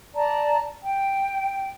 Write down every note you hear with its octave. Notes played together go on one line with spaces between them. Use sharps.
D5 A5 A#5
G5